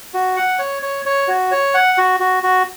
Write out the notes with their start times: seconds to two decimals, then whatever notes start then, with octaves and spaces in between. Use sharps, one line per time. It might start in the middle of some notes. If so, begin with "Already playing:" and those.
0.14 F#4
0.36 F#5
0.59 C#5
0.82 C#5
1.06 C#5
1.28 F#4
1.52 C#5
1.74 F#5
1.98 F#4
2.20 F#4
2.43 F#4